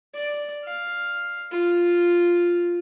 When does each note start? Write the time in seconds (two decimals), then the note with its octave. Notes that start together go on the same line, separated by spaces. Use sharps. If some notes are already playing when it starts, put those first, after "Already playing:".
0.15 D5
0.65 F5
1.51 F4